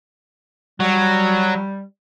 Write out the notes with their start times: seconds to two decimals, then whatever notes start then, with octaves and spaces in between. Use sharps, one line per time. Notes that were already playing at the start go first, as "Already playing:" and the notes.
0.80 F#3 G3